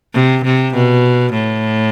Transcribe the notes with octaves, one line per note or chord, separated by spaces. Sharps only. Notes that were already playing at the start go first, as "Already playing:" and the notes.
C3
C3
B2
A2